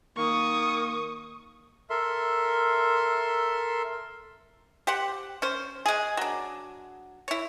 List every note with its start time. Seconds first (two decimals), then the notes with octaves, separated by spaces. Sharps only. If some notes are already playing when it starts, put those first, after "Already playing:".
0.17 D#3 A#3 C#6 D#6
1.90 A4 A#4 E5 C6
4.87 G4 C5 F#5
5.42 C#4 C5
5.86 G#3 G#4
6.17 F#3 D4
7.28 E4 C#5